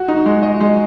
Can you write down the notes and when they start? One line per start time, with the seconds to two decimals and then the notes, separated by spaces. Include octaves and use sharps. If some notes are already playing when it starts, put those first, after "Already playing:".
Already playing: F#4
0.08 D#4
0.26 G#3
0.43 D#5
0.60 G#3